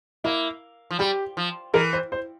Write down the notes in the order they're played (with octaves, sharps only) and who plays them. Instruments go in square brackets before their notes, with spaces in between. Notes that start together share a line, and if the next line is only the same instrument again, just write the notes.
[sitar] A#3 [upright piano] E4
[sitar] F3
[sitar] G3 [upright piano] G4
[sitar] F3
[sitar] E3 [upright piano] A#4
[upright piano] C5
C5